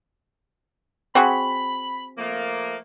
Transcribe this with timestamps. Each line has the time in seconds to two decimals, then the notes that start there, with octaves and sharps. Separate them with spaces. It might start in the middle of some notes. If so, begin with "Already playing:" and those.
1.15 C4 F#4 G#4 B5
2.18 F3 A3 A#3